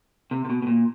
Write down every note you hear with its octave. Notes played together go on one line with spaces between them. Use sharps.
C3
C3
B2
B2
A#2